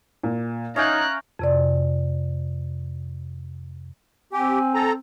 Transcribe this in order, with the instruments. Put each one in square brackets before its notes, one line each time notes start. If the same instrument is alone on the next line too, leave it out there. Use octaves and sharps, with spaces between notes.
[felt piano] A#2
[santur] C#4 F5 G5 [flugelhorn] D#4 [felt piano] E5 [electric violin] A#5 F#6
[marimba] F2 C3 D5
[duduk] C4 [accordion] G4 [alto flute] G#5
[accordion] A4 A#5